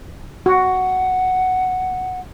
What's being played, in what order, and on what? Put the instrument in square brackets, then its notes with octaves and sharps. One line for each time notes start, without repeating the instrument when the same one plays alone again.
[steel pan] F#4 [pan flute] F#5